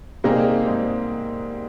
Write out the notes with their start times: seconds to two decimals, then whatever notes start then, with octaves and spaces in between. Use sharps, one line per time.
0.24 C3 G3 A#3 C4 D#4 G#4
0.65 G#2 G3 C4